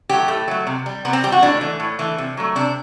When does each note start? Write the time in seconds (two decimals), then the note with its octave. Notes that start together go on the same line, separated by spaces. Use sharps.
0.09 F#3 A3 G4
0.28 A2 A3
0.48 F#3 A3
0.67 C3
0.86 G3
1.05 C3 B3
1.13 C4
1.23 G3 G4
1.32 F#4
1.42 A2 D4
1.61 E3 A3
1.80 A2
1.99 E3 A3
2.18 C3
2.37 F#3 A3
2.55 C3 D4